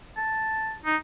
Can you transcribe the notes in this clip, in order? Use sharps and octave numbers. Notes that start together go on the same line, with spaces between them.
A5
D#4